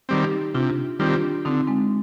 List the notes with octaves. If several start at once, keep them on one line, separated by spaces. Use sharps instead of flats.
D#3 G3 C4
D#4 G4
C3 D4 F4
D#3 G3 C4 F4
G4
D4 F4
D3 C4 D#4
G#3 C4